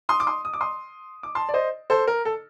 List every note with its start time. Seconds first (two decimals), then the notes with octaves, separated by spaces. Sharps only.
0.09 C6 D#6
0.20 D6
0.27 C6 D#6
0.45 D#6
0.53 D6
0.61 C6 D#6
1.23 D6
1.35 A5 C6
1.49 D5
1.54 C5 D#5
1.90 A4 C5
2.07 A#4
2.25 A4